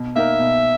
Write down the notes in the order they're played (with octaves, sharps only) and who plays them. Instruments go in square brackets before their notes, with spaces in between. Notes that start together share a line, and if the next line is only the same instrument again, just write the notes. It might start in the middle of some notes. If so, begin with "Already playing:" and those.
Already playing: [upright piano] B2
[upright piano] A#3 D#4 A#4 [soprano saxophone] E5
[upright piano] B2